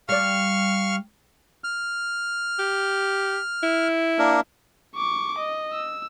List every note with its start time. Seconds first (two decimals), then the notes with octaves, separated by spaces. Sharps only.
0.09 G3 D5 F5 C#6 F6
1.64 F6
2.59 G4
3.63 E4
4.19 A#3 D4 A#4
4.96 C#6 D6
5.38 D#5
5.73 E6